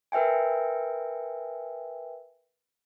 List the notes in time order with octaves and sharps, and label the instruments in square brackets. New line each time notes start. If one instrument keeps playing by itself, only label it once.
[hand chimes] A#4 B4 E5 G5 G#5